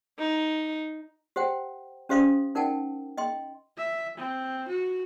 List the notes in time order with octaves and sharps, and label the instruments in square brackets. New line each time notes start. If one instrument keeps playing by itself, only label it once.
[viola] D#4
[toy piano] G4 C5 F#5 G5
C#4 G4 C5 F5 C6 D#6
D#4 A#4 F#5 G5 A5
D#5 G5 C6
[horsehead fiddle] E5
C4
F#4